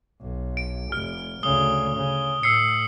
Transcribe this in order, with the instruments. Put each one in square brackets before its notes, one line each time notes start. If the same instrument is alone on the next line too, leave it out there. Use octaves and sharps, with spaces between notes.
[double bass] B1
[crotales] D7
[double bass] F1 [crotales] F6
[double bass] D2 C#3 [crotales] D#6 G7
[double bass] C#3
[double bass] A2 [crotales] E6 C7 C#7